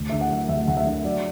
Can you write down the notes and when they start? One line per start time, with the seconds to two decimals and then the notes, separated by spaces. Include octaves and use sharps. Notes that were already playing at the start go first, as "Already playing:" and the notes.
Already playing: D2
0.09 D3 E5
0.21 F#5
0.30 F#3
0.49 D2 E5
0.68 D2 F#5
0.77 E5
0.87 D3
1.05 F#3 D5